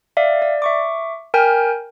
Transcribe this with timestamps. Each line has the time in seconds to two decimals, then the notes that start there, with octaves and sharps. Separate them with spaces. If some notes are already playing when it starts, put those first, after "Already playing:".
0.17 D5 E5 F5
0.42 D5
0.62 E5 C#6 D6
1.34 A#4 G5 G#5 F6 G6